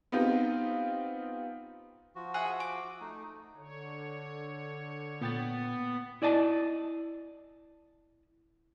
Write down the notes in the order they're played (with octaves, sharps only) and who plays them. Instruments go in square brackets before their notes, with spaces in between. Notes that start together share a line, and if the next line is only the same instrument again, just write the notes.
[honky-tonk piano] B3 C4 D#4 F4 G4
[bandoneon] F3 F#4
[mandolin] G#4 E5 F#5
D6
[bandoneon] A3 D#4
[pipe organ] D3 C#5
[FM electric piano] A#2 G5 A6 [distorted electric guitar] B3
[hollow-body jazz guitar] E4 D5 D#5 A5